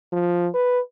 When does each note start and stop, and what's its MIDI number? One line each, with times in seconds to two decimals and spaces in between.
0.13 0.47 53
0.54 0.79 71